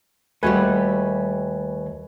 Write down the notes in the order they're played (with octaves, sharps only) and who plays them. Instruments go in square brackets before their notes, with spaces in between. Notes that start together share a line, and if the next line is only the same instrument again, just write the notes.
[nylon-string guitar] D#2 F#4 [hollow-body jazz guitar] G3 A3 [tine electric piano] B4 G#5